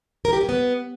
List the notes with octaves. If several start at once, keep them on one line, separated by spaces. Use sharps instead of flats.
A#4
G4
C#4
B3